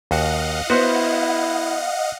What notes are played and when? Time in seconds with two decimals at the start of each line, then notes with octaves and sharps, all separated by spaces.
0.11 D#2 F#4 D#5 F5 F#5
0.70 B3 E4 F#4 C5